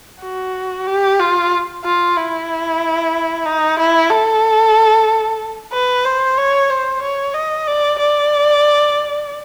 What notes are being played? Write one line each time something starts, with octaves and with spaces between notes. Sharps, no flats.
F#4
G4
F4
F4
E4
D#4
E4
A4
B4
C5
C#5
C5
C#5
D#5
D5
D5